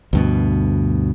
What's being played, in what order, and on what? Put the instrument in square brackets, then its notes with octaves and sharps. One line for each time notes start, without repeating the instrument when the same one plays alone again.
[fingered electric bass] D2 G2 B2